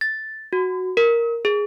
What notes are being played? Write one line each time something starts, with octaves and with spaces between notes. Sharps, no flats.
A6
F#4
A#4
G#4